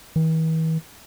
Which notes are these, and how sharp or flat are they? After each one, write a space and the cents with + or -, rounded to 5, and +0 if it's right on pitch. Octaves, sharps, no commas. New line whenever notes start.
E3 -45